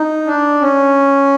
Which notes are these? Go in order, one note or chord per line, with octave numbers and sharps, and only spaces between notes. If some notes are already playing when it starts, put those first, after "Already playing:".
Already playing: D#4
D4
C#4